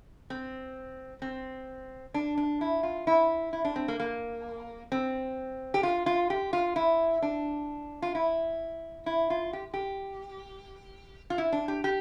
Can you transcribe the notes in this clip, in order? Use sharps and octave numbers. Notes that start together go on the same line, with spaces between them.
C4
C4
D4
D4
E4
F4
E4
E4
D4
C4
A#3
A#3
C4
G4
F4
F4
G4
F4
E4
D4
F4
E4
E4
F4
G4
G4
F4
E4
D4
G4
G4